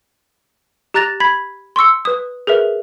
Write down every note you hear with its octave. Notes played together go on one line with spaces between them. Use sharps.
G4 A#5 F#6 A6 A#6 F7
B5 G#6 B6
C6 C#6 E6 C#7
B4 D#6
G#4 A#4 B4 E5